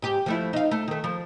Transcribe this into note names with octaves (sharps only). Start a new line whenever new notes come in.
G#2 G4
F3 A3 E4
D#4 F5
A3
D#3 A3
F3